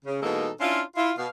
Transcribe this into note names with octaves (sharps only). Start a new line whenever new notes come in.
C#3
B2 E3 G#3 A#3 D#4 A4
C#4 D4 E4 F4
E4 F4
B2 F5